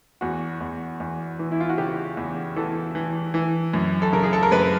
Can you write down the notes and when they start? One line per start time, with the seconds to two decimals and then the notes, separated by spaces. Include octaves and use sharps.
0.21 E2 F#4
0.60 E2
1.00 E2
1.39 E3
1.52 E4
1.60 F4
1.69 F#4
1.78 C#3 G4
2.17 E2
2.56 E3 A4
2.95 E3
3.34 E3
3.74 F#2
4.02 A4
4.12 C#3 A#4
4.23 G#4
4.33 A4
4.43 A#4
4.51 F#2 B4